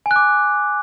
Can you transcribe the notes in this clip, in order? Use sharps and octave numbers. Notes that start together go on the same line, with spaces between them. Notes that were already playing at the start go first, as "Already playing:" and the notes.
G#5
F#6
D6